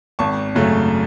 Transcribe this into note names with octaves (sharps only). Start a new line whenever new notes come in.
G#1 A5 C#6
F#2 C#3 F#3 A3